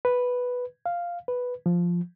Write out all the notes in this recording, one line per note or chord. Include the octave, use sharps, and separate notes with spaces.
B4
F5
B4
F3